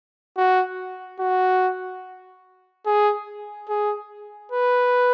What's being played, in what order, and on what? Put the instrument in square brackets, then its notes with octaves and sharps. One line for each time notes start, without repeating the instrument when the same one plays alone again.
[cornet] F#4
F#4
G#4
G#4
B4